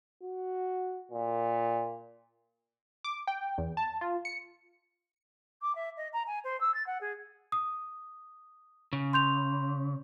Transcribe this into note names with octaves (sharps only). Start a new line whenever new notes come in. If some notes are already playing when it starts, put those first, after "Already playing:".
F#4
A#2
D6
G5
E2
A5
F4
C#7
D6
E5
D#5
A#5
G#5
C5
E6
A6
F#5
G#4
D#6
C#3
C6 G6 F7